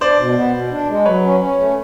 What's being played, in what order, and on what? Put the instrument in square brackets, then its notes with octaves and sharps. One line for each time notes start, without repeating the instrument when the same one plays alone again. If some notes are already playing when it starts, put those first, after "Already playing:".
[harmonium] D4 [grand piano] C5 D5
[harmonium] B2
B3
B2
D4
G#3
[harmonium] F#3 [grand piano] B4 C#5
[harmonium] C#4
C#4
A3